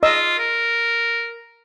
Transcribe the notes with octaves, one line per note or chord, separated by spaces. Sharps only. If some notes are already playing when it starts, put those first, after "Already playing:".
F4 D#5 E6
A#4